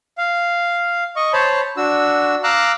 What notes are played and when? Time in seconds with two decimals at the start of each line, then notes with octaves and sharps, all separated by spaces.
0.18 F5
1.16 D#5 C#6
1.33 C5 C#5 A5 B5
1.77 D4 F#4 E6
2.44 F5 A#5 D6 E6 F#6